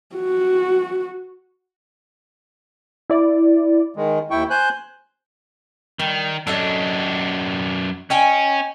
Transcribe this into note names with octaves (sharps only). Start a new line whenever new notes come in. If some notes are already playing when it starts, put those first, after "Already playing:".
F#4
E4 D5
D#3 G#3
D#2 E4 G5 C#6
C5 G#5 F#6 G6
D#3 G3
F#2 D4 A4 C#5 D#5
C#4 D#5 G5 G#5